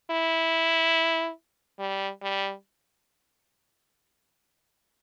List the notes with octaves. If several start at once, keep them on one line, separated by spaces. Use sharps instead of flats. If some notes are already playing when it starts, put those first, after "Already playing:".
E4
G3
G3